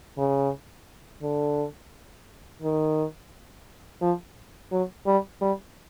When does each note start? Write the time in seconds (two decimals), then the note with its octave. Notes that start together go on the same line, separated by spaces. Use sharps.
0.18 C#3
1.22 D3
2.62 D#3
4.02 F3
4.72 F#3
5.06 G3
5.41 G3